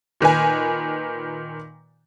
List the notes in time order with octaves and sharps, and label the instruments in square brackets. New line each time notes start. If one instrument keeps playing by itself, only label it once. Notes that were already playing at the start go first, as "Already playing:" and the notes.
[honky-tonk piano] A#2 D#3 B4 G#5